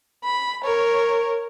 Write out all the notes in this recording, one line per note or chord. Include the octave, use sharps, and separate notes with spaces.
B5
A#4 C#5